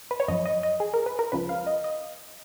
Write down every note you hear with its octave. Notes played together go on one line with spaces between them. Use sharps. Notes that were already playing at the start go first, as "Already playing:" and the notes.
B4
C#5
F#2 F3 D#5
D#5
D#5
G#4
A#4
B4
A#4
C#2 C#3 F3 B4
F5
D#5
D#5